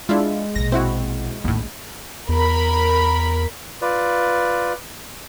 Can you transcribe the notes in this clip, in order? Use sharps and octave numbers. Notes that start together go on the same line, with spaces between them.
G#3 D4 E4 F4
A#1 B2 A#6
C4 E4 F#4
A#1 D#2 A2 D4
E2 A#4 B5
F4 B4 D5